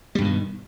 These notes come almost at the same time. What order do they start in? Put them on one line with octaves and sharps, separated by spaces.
G3 G2 B2 D#3